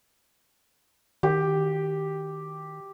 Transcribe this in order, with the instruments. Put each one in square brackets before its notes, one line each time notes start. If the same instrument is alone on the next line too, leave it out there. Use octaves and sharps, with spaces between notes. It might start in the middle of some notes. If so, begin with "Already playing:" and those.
[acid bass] D#3 [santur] G4